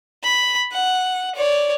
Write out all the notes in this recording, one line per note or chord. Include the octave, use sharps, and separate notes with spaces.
B5
F#5
C#5 D5